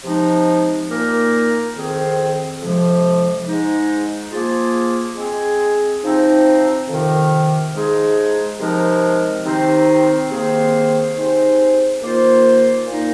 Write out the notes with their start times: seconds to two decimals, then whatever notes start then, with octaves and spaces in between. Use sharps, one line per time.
0.04 C3 F3 G#3 D#4
0.89 A#2 A#3 D#4 A#4
1.75 F2 D#3 C4 G#4 C5
2.60 F2 C3 F3 G#3
3.46 G#2 G#3 D#4
4.31 F3 A#3 F4 G#4
5.17 G#3 C4 G#4
6.02 C3 F3 C4 D#4
6.88 F2 C3 D#3
7.73 F3 G#3 D#4 G#4
8.59 C3 F3 G#3 D#4 A#4
9.44 C3 D#3 C4 D#4 C5
10.30 C3 D#3 A#3 G#4 C5
11.15 C3 G#3 D#4 C5
12.01 D#3 A#3 F4 C5
12.87 A#2 A#3 D#4